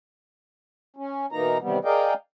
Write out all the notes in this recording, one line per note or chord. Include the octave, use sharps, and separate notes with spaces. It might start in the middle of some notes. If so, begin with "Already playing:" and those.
C#4
B2 E3 A#3 D#4 A#5
C3 D#3 E3 G3 B3
G#4 A#4 D5 D#5 F5 G5